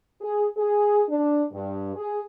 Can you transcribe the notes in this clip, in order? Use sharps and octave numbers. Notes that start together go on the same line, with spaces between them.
G#4
G#4
D4
G2
G#4